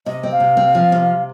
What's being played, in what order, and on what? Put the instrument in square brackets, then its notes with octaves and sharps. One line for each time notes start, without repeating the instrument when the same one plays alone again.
[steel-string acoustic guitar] C3 [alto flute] D#5
[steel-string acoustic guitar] C4
[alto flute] F5
[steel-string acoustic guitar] C3
C4
F3
C3